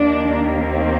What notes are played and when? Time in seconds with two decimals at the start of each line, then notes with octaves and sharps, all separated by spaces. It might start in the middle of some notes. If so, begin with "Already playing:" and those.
Already playing: D#2 D#3 A#3 D4
0.59 C4